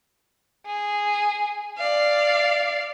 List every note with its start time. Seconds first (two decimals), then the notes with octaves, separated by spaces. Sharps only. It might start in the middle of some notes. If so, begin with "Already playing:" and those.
0.66 G#4
1.78 D5 F5